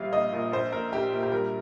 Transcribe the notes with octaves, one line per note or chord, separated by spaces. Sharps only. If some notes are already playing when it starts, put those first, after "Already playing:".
Already playing: A#1 G3 F5
A#1 D#5
A#2
A#1 C5
A#1 A#4
A#1 G4
A#2
G4
G3 A#4